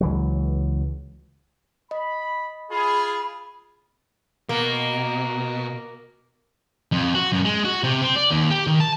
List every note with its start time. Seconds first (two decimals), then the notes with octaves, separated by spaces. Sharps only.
0.01 C#2 E3 F#3
1.91 D#5 B5
2.71 F4 G#4 B5
4.49 B2 A#3
6.92 F2
7.15 F#4
7.32 F#2
7.45 G#3
7.65 F#4
7.84 C3
8.02 C4
8.16 D5
8.30 D#2
8.51 G4
8.67 D#3
8.80 A5